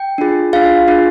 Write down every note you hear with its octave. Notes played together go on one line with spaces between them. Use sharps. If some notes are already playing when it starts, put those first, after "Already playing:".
Already playing: G5
D4 F4 G#4
D4 F4 G#4 F5
D4 F4 G#4